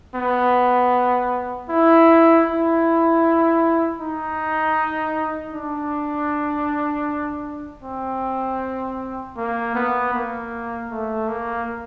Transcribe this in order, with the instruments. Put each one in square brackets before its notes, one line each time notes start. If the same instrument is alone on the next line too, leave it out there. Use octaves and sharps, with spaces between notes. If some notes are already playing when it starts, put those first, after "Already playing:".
[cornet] B3
E4
E4
D#4
D4
C4
A#3
B3
A#3
A3
A#3